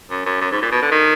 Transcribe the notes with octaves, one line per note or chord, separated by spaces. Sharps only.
F#2
F#2
F#2
G#2
A#2
B2
D3
D#3